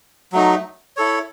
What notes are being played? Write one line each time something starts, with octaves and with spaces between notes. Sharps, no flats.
F#3 A3 D#4
E4 A4 C#5